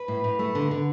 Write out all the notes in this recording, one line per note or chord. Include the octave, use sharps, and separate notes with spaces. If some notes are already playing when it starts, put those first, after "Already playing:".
Already playing: B4
A2
A2
A3
D3
D3